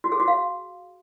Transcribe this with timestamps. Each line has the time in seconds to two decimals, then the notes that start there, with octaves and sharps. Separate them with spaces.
0.04 F#4
0.12 G#4
0.20 F#4
0.28 F5